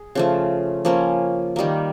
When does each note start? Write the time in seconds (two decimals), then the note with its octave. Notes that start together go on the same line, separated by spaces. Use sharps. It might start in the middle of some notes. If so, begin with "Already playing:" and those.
Already playing: G#4
0.15 C#3 F3 A3
0.85 F3 A#3 C#4
1.56 D#3 G3 A#3